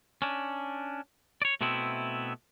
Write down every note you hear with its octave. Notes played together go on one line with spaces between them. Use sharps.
C#4 D4
C#5 D5
B2 A3 B3 C4 E4